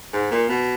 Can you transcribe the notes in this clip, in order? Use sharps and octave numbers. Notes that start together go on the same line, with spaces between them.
G#2
A#2
B2